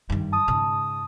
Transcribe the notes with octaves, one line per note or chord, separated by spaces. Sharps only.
G2 D#3
A5 D#6
G#2 C#3